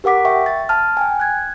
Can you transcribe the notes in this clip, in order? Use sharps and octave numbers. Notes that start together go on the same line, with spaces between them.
G4 A#4 F#5 D6 B6
E5 G5 C#6
A6
A5 F6
G5 G#5
F#6 G#6